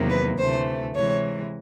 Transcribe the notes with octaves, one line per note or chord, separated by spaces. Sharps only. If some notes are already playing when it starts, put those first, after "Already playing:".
Already playing: E2 C3 D#3 F#3 A#3
B4
D2 C3 E3 A3 C5
C3 E3 G#3 C#5